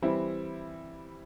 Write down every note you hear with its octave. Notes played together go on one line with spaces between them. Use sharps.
E3 G3 C4 E4